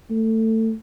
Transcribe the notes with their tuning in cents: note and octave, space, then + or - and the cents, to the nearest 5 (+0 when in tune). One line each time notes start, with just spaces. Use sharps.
A3 +20